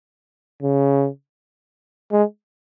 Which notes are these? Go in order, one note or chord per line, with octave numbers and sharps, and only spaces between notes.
C#3
G#3